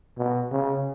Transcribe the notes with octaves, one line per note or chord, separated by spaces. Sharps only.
B2
C#3